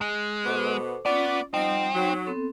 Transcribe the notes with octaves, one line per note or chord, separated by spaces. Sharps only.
G#3
B2 B3 A4 C5 D6
B3 C#4 F4 D5
F3 G3 C4 D#4 F#5
F#3 D#4
B3 C4 A4